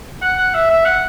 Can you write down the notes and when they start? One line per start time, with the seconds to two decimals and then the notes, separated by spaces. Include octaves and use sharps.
0.22 F#5
0.38 F#5
0.54 E5
0.70 E5
0.85 F#5